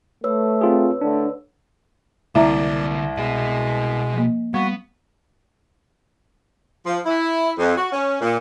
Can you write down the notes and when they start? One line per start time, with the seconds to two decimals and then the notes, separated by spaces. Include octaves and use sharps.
0.24 A3 B4 C#5 E6
0.61 C4 F4 G#4
1.01 A2 D3 D4
2.35 C2 D3 A#3 E4 D5 E5 A#5
3.17 B2 G#3 D#5
4.14 F3 A#3
4.54 G3 B3 F#4
6.86 F3
7.06 E4
7.58 F2
7.77 F#4
7.92 C#4
8.21 A#2